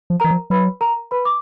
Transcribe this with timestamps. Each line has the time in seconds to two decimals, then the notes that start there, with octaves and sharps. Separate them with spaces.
0.10 F3
0.20 E3 A#4 A#5
0.31 F3
0.50 F#3 B4 B5
0.81 A#4 A#5
1.11 B4 B5
1.25 D6